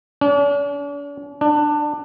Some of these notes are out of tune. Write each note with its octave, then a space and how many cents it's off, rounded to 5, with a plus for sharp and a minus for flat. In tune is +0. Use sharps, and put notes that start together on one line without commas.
D4 -45
D4 +20